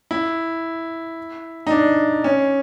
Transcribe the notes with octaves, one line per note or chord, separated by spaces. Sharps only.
E4
D#4
D4
C#4